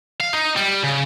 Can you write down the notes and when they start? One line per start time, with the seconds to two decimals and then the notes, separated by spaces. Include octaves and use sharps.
0.20 F5
0.33 D#4
0.56 G3
0.84 C#3